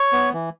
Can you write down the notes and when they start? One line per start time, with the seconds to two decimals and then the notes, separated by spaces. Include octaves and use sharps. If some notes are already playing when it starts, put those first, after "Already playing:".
Already playing: C#5 C#6
0.13 B3
0.33 E3